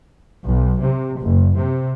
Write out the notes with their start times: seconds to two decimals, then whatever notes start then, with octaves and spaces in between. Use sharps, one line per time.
0.45 B1
0.81 C3
1.21 F#1
1.58 C3